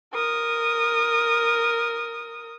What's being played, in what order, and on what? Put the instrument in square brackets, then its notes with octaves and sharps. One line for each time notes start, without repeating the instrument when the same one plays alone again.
[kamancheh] A#4 D#6